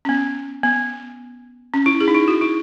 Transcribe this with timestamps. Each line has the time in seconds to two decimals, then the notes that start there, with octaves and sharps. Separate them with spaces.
0.05 C#4
0.09 B3
0.64 B3
1.74 C#4
1.86 E4
2.00 G#4
2.08 D#4
2.15 E4
2.28 F#4
2.41 E4